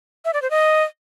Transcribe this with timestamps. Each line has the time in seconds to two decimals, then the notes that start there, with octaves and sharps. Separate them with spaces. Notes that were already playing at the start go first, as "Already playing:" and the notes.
0.25 E5
0.34 D5
0.42 C5
0.51 D#5